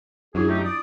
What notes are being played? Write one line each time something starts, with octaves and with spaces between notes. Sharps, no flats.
F#2 D4 E4 F4 G#4
F#3 A3 D#4 G4
D5 D#6